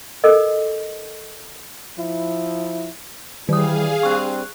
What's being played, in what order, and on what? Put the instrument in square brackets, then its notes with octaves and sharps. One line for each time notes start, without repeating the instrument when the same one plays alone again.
[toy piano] A4 A#4 D#5
[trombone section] F3 E4
[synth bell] D#3 D#6 [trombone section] E3 G3 [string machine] G#4 F5
[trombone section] G3 C4 D4 [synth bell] C#6 F#6